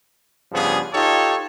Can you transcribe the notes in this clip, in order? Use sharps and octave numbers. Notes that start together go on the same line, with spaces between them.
G2 C#3 F3 B3 G#4
D#4 F4 G4 A4 C#5